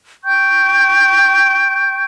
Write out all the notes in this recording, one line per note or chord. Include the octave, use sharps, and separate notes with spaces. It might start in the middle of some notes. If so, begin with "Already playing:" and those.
G5 C#6 G6